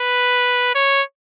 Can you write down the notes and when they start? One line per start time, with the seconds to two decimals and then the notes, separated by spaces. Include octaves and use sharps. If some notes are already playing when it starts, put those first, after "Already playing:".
Already playing: B4
0.75 C#5